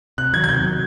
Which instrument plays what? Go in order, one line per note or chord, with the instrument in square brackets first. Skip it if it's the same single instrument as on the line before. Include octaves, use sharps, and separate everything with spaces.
[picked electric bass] C3 [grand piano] F#6
[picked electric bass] D#3 F#3 [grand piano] G#6
[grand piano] G#6
[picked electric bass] C3 [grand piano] G6
[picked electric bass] D#3 F#3